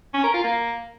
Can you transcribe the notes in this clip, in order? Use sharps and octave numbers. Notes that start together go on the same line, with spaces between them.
C#4
A#4
F4
A#3